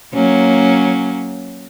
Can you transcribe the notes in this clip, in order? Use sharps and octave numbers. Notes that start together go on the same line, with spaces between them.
F#3 A#3 C#4